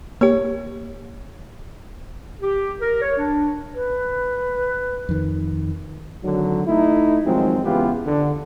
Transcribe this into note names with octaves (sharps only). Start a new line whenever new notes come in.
A#3 G4 C#5
G4
A#4
C#5
D4
B4
F2 D#3
G#1 D3 D#3 F#3
A3 D#4 E4
G#1 D#3 F3 F#3 G#3 C4
C#3 E3 G#3 B3 F4 G4
D3